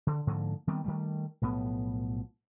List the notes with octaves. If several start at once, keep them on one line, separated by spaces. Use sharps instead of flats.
D3
G#2 D3 F3 A#3
D#3 G3 B3 C4
D#3 G3 A3
B1 A2 F3 B3